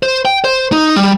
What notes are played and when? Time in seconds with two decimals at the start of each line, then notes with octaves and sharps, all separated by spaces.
0.03 C5
0.25 G5
0.44 C5
0.72 D#4
0.96 G3